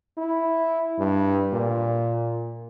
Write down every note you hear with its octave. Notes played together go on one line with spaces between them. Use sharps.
E4
G2
A#2